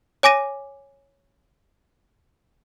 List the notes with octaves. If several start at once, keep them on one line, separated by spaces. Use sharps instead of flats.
C#5 G#5 D6 A#6 D#7